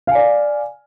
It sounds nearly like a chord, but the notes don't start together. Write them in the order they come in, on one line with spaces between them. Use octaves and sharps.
F5 G#5 D5